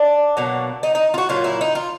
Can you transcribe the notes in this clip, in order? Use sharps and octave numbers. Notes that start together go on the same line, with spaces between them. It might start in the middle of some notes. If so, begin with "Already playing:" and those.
Already playing: D4
B2 F#3 A#3
D#4
D#4
F4
F#4
A#2 F#3 A#3 F4
E4
D#4
F4